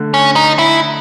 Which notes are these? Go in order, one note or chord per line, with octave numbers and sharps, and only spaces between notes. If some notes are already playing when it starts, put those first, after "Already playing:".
Already playing: D3 A3
C#4
D#4
E4